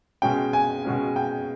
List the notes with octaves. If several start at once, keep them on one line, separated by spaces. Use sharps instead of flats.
B2 G#3 C#4 G5
G#5
B2 G#3 C#4
G5